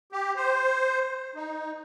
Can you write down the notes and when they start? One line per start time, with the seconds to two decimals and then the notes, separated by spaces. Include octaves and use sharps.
0.12 G4
0.36 C5
1.35 D#4